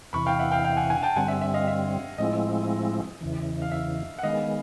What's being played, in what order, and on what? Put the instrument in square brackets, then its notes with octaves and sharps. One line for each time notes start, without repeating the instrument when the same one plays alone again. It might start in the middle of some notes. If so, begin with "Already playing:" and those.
[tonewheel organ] E2 C3 E3 [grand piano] B5 C#6
[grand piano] F5 G5
E5 F#5
F5 G5
F5 G5
F#5 G#5
F#5 G#5
G5 A5
[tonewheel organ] G2 D3 G3 C4 [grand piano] F#5 G#5
[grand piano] E5
E5
D#5 F5
E5
[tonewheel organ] A2 F3 G#3 C4 E4 [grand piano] D#5
[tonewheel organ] E2 C#3 E3
[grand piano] F5
E5
F#5
[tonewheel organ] D#3 G#3 B3 [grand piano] D#5 F5